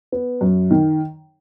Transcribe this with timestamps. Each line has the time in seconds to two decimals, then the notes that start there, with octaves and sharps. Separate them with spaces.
0.12 B3
0.41 F#2
0.71 D#3